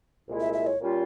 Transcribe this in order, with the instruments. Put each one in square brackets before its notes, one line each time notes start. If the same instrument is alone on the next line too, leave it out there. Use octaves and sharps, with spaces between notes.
[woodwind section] C2 A#2 G#3 E4
[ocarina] E5
E5
C#5
[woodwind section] A#2 G3 C#4 F4